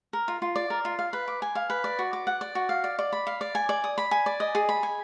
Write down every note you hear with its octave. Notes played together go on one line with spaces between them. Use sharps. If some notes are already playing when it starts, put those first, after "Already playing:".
A#4
F4
F4
D5
A#4
F4
F5
B4
D6
G#5
F5
B4
D5
F#4
D6
F#5
D5
F#4
F5
D5
D5
B5
F5
D5
G#5
D5
D#6
B5
G#5
D5
D#5
G#4
B5
G#5